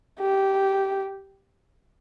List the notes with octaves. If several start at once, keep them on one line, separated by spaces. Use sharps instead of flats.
G4